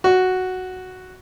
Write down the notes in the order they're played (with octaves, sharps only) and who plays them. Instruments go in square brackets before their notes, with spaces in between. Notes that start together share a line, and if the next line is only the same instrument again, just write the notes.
[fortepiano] F#4